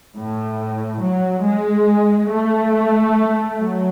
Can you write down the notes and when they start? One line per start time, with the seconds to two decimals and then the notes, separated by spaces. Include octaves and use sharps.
0.15 A2
1.01 F#3
1.45 G#3
2.30 A3
3.59 F#3